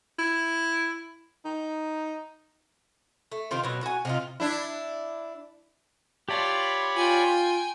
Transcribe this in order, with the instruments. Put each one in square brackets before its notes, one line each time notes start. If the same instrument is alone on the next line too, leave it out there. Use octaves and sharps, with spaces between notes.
[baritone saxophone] E4
D#4
[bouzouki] A3
C3 D#3 C4 F4
B2 F#3
F#4 G#5
C3 D#4 F4
[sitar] D4 E4
[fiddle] F4 [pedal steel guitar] G4 A5 [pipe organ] C#5 D5 B5
[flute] F4 [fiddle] G5 G#5